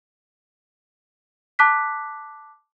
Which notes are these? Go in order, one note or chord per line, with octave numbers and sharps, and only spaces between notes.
A5 D6 F#6 B6